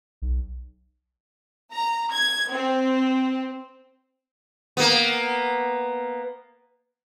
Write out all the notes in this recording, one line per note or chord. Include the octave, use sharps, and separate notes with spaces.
B1
A#5
G#6
C4
A#3 B3